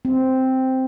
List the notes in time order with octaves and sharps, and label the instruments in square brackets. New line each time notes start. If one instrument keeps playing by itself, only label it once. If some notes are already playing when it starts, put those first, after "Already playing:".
[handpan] C4